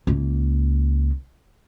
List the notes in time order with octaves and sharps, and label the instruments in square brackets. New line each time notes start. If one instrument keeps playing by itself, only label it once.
[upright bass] C#2 A#3